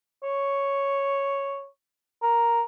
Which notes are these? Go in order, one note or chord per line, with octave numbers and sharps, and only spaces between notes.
C#5
A#4